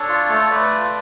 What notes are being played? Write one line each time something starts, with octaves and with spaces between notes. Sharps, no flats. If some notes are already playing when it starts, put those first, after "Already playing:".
Already playing: D4 A4 C#5
F4
A3
A3 B4 D5
F4